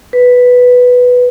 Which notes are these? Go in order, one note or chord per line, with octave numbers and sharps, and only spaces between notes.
B4